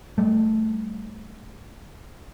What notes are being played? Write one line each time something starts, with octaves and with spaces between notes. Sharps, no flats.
G3 A3